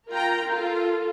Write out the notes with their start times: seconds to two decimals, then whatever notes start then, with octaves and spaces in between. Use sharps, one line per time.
0.11 F4 A#4 G5 A#5
0.49 F4 A4